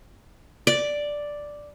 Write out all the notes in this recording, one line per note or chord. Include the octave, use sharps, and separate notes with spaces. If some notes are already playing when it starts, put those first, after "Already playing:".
D5